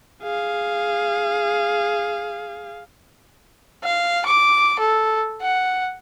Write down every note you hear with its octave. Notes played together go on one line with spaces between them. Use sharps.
G#4 F5
F5
D6
A4
F#5